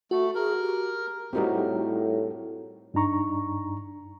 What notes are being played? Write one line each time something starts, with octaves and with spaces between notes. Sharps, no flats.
A3 F#4
G#4 A#4
G4
A2 G3 C4 D#4 F#4 G4 A#4
G2 D4 D#4 A#5 C#6